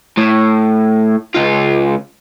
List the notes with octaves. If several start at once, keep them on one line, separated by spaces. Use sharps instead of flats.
A2
C#2 F4